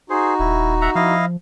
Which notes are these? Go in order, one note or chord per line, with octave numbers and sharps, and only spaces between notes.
D#4 F#4 G#4 C5
D#1 E4
E5 F#5 A#5
F3 E4 D#5 F5